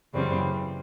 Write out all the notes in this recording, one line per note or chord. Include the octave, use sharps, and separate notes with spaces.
F#2 C#3 E3 G3 C4